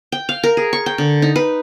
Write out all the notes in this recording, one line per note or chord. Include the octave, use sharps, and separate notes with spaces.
G5
F5
A#4
G#4
C#6
G5
D3
D#4
B4